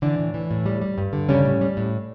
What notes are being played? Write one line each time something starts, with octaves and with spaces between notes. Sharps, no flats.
D3 E3 D4
A2
E3
A2
G3
G3
G2
D3
C#3 G3 C#4
A2
G3
A2